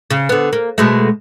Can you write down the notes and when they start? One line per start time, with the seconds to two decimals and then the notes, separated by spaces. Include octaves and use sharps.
0.11 C#3
0.29 D3 B3
0.53 A#3
0.78 B2 G#3 A3